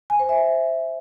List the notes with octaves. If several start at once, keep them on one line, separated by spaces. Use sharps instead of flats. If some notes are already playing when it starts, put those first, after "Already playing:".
G#5
C5
E5